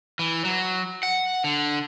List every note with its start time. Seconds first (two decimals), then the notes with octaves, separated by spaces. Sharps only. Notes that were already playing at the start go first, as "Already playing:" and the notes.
0.19 E3
0.45 F#3
1.03 F#5
1.44 D3